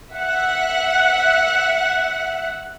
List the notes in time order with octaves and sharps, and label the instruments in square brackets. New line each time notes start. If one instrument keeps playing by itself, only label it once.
[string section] E5 F#5